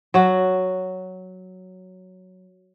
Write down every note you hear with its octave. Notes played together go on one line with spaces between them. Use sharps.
F#3 F#4